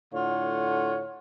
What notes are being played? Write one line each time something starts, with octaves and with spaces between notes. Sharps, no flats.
A2 D3 F4 C#5 F#5